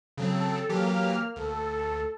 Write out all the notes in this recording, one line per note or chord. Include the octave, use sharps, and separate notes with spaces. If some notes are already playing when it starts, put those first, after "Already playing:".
C#3 F#3 C4 A4
E3 F#3 A#3 G4 F6
D2 A4